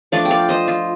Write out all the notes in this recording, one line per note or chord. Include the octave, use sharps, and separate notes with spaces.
F3 A3 D4 D5 F5
G5
D5 F5
C5 D#5
F4